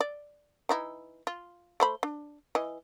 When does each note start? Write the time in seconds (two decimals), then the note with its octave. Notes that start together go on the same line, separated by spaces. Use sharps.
0.01 D5
0.69 E3 D#4 E4
1.27 F4
1.80 A3 C5 B5
2.03 D4
2.55 E3 D#5